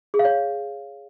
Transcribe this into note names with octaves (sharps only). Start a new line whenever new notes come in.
G#4
F5
C#5